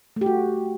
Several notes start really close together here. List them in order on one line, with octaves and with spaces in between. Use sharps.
A3 G4 F#4